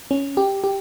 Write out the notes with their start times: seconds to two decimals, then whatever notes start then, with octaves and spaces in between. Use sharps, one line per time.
0.11 C#4
0.37 G4
0.64 G4